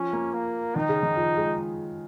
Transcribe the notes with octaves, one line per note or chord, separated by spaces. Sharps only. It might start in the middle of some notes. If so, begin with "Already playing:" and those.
Already playing: F3 C#4
A#3
A#3
D#3 D#4
C#3
D#3
F3
G#3